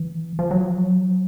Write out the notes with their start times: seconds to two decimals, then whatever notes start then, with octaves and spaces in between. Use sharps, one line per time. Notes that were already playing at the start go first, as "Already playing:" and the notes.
Already playing: E3
0.39 F3
0.51 F#3
0.63 F3
0.74 F#3